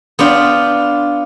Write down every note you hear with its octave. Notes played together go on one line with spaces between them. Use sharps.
B3 D4 F4 G5